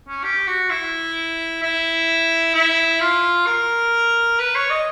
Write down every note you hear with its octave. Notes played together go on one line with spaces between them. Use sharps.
C#4
G4
F#4
E4
E4
E4
F4
A#4
B4
C#5
D#5